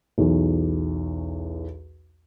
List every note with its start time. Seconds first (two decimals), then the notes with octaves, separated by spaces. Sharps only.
0.18 B1 E2